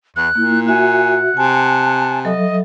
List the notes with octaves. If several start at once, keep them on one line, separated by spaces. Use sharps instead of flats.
E2 F#6
A#2 A#3 E4
F#4 E5 F#5 G#5
C3 G#5 A5
F#3 A4 D#5 E5